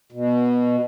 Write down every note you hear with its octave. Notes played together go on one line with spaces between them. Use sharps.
B2